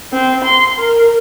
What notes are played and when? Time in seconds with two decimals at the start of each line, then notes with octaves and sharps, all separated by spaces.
0.13 C4
0.45 C6
0.79 A#4